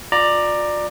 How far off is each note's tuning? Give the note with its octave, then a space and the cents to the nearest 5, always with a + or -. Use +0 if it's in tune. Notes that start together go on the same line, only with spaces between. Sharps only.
F4 +35 D5 +15 A#5 +0